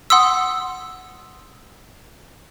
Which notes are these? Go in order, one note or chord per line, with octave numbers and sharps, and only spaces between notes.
F#5 C6 D#6 E6